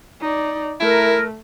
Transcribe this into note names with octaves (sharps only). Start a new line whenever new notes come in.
D#4 D5
A3 E4 A#4